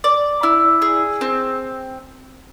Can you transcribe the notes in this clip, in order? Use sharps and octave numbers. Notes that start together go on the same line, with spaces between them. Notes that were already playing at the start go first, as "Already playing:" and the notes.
D5
E4
G#4
C4